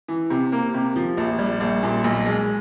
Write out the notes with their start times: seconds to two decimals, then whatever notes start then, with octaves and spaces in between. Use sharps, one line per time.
0.08 E3
0.30 C3
0.52 A#3
0.74 C3
0.96 F3
1.17 A#1
1.39 G3
1.60 A#1
1.83 A#2
2.04 B1
2.26 G#3